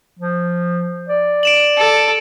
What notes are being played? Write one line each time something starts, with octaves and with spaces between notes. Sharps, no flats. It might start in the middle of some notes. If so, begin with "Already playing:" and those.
F3
D5
D7 E7 F#7
A4